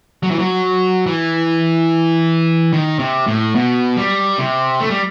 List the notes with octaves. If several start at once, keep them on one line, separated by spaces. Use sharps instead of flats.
F#3
E3
F#3
E3
D#3
C3
A2
B2
G3
C3
A3
G3